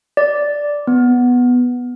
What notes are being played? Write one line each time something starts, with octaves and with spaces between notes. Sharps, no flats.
D5
B3